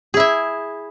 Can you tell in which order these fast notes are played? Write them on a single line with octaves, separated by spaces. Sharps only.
G#4 E4 E5